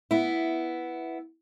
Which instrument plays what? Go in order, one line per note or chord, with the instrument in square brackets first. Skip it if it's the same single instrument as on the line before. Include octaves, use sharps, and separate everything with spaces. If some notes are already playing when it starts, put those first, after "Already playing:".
[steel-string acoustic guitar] B3 E4